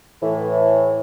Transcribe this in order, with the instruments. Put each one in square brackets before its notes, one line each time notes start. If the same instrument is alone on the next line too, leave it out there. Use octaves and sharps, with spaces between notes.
[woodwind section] A2 E3